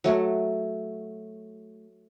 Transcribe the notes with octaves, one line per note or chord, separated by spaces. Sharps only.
F#3 A3